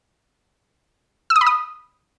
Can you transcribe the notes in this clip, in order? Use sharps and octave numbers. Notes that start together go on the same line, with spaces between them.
E6
D#6
B5
D#6